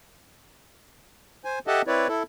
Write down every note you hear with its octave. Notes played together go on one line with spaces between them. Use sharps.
C5 G#5
G4 A4 D#5 E5 F#5 A5
C4 E4 B4 C#5 D5
E4 A4